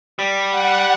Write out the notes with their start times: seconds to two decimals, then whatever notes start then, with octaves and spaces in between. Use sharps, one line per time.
0.19 G3
0.49 F#5